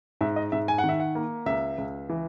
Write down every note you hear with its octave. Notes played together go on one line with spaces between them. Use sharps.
G#2 E5
D#5
G#2 E5
G#5
F#5
D#3
E5
F#5
A#3
C#2 E5
C#2
E3